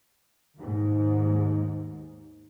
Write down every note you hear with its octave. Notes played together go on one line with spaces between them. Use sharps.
D#2 G#2